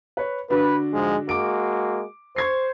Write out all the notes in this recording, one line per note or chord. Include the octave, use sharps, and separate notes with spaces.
B4 C#5
D3 D4 F#4 B4
G#2 F3 G#3
G#3 A#3 F#4 D6 D7
C5 C#6 G#6 C7